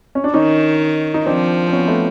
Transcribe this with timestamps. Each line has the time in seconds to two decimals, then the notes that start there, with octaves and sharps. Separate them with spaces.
0.15 C#4
0.24 D4
0.34 D#3 C#4 D#4
1.14 D#4
1.26 F3 C4 D4
1.68 C4
1.72 B3 C#4
1.88 A3 B3